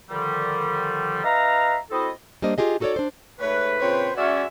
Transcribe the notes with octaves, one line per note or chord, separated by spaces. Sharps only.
A#2 D3 D#3 F3 G3
D#4 B4 E5 F5 A#5
C4 E4 F#4 A4 D#5
G3 A#3 D4 C5 D#5
F4 G4 G#4 D#5
D#4 F#4 A4 B4 C#5 D5
D4 C5
G#2 A3 B4 C#5
A#2 C#3 C4 C5 C#5
G#3 C#4 F#4 D5 E5